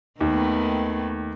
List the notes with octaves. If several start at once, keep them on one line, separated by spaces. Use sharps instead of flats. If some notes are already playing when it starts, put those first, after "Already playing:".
D#2 D#3 A3 B3